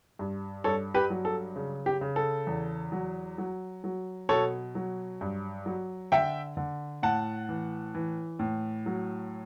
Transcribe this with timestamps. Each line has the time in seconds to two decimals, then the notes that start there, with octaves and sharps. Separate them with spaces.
0.19 G2
0.64 G2 A4 C#5
0.94 G4 B4
1.10 F#3
1.25 A4
1.56 C#3
1.86 G4
2.01 C#3
2.16 A4
2.47 E2
2.92 F#3
3.38 F#3
3.84 F#3
4.29 B2 A4 C#5
4.75 F#3
5.21 G2
5.66 F#3
6.12 D3 E5 G5
6.57 D3
7.03 A2 F#5 A5
7.49 E3
7.95 E3
8.39 A2
8.86 F#3